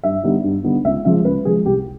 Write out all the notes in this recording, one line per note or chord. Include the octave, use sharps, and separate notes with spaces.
G2 E5
D3 G3 B3 D#4
G2
D3 G3 B3 D#4
C#2 E5
C#3 F3 G#3 E5
C#2 B4
C#3 F3 G#3 G#4
C2 G4